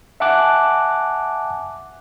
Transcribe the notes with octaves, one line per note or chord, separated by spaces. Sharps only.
E5 F#5 G#5 A5 D6 F#6